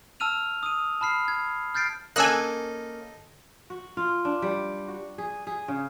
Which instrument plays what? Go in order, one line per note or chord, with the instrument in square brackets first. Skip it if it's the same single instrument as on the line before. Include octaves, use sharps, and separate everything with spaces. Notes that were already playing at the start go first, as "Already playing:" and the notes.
[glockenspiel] A5 E6 F6 D#7 F7
D#6 D#7
A5 B5 F6 C7
G#6
F6 G6 A6 C7 D7
[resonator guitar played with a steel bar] A#3 C#4 [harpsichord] D#4 A4 [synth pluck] G#5 E6 F#6
[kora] F#4
F4
D4
G3
F#4
G#4
G#4
C#3